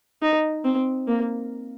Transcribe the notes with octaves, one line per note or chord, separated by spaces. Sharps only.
D#4
C4
A#3